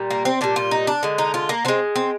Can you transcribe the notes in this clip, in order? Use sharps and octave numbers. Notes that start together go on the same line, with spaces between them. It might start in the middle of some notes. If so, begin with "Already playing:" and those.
Already playing: A#2 G3
A#3
C4
A#2 G3 D4
F4
D#4
D4
D3 G#3
D#4
F4
A#3
D3 G#3 C4
C4